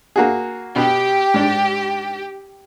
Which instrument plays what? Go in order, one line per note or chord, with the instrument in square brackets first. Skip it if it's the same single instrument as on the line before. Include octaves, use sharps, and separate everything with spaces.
[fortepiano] A#3 F#4 G#4
[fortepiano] B2 B3 [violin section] G4
[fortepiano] G#2 D4